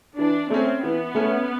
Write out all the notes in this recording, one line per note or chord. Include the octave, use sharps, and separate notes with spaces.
E3 D4
A3 C4 C#4
E3 B3
A3 C#4